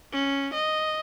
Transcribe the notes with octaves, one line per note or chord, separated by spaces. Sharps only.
C#4
D#5